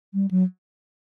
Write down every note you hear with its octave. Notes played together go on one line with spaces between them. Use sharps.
G3
F#3